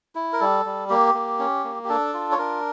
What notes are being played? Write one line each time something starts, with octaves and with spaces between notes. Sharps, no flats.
E4
A#4
G3 A4
G3
A#3 G4
A#3
C#4
A#3
G4
D4 A4
F4
C#5
D4 A#4